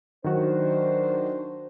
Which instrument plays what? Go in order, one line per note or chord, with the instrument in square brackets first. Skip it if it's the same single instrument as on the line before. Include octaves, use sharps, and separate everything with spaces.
[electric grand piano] D#3 F#3 F#4 [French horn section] D4 C5